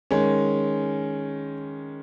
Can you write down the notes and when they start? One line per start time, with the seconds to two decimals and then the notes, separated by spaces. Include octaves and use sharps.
0.11 D#3 G#3 C#4